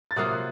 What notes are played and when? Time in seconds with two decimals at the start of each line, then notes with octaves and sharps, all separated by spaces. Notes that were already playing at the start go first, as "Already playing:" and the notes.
0.11 A6
0.16 C3 F#3 A#3 F4 D#6 F#6